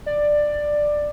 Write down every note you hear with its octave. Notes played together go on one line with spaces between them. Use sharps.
D5